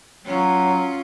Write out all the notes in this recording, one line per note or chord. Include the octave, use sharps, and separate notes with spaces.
F#3 C#4 F4